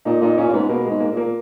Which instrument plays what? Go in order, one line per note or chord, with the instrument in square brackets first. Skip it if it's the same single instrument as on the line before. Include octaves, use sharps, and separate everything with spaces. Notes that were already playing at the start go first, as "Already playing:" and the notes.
[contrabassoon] A#2 [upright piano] D#4
[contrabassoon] A#2 [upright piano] D#4
[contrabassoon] A#2 [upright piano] C#4
[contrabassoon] A#2
[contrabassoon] G#2 [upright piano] B3
[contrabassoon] B2 [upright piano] A#3
[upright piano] G#3
[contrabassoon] G#2
[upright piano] A#3
[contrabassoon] A#2
[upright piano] A#3